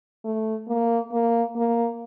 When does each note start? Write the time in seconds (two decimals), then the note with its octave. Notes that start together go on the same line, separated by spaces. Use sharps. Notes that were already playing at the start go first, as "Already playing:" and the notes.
0.24 A3
0.68 A#3
1.12 A#3
1.56 A#3